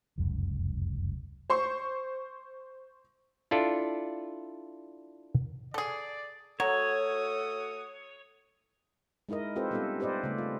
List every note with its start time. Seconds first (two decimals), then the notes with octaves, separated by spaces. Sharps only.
0.18 F1 C#2 F#2
1.50 C5 C6 C#6
3.51 D4 E4 F4 A4 D5
5.74 G#4 A4 D5
6.60 F#3 A3 F#4 A4 C#5 D#6
9.29 G#3 D#4 E4 A#4 D#5
9.56 C4 F4 G4 A4 B4 C5
9.71 G3 B3 C#4 D#4 F4 A4
10.00 G4 B4 C5 D5 D#5
10.24 C#3 A3
10.38 F4 G#4